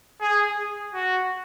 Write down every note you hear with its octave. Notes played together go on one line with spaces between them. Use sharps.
G#4
F#4